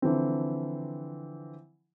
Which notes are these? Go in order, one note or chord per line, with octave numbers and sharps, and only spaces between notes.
D3 E3 F3 C4